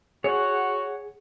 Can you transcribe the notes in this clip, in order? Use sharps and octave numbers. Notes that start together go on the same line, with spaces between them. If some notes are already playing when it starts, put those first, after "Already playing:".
F#4 G#4 C#5 F#5